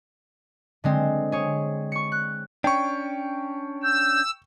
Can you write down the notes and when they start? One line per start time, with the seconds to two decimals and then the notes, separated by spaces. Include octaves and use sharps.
0.84 D3 G#3 C4
1.32 G#4 C#5
1.92 C#6 C#7
2.12 F#6
2.64 C#4 D4 G5 C#6
3.83 E6 G6